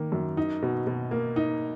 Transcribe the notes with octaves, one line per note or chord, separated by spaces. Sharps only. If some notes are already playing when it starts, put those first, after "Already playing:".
Already playing: D#3 A#3
F#2
D#4
B2
B2
A#3
D#4